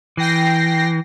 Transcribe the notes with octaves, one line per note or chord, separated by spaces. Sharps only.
E3 G5 A#6 C7